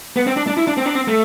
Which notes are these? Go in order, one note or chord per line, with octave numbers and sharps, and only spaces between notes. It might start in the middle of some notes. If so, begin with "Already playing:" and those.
B3
C4
D4
D4
E4
D4
C4
D4
C4
A3